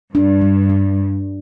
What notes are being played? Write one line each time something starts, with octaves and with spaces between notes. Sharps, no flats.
G2 D4
G3
D4